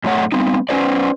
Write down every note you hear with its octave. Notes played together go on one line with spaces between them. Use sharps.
F#2 A2 A3 C#5 F#5
G3 B3 C4 D#4
C#4 B4 C5 D5